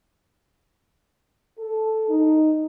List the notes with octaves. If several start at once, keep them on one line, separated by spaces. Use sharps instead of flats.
A4
D#4